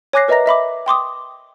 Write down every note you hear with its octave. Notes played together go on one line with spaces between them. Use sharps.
C#5 G#5 D6 F#6 A#6 C7
A#4 B4 D#5 E5 A#5 A#6
D#5 E5 B5 D6
G5 C6 D6 D#6